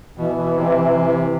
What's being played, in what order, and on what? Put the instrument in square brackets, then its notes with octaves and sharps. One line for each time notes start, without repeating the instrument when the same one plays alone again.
[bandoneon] B2 [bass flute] E3
[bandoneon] B2
C3